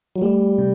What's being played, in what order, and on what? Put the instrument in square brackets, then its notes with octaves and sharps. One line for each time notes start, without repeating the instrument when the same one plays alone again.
[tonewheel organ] F#3
[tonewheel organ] G3 [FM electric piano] A3
[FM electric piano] C3